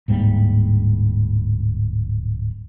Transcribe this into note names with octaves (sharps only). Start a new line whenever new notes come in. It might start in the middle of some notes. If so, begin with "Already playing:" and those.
D1 G#2 G3 A#3